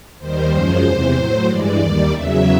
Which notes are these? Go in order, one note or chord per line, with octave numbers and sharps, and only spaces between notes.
D#2 D#3 G3 C5
F#2 C#3 F3 G#3 C5
E2 C3 E3
A2 F#3
G2 E3 G#3 D5
D#2 D#3 G3 D5
E2 C#3 F#3 E5